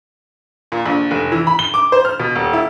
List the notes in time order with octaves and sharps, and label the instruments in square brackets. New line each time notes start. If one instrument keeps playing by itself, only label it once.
[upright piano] A#2
A#1
F1
E3
B5
G7
D6
C5
F6
B2
D#1
E4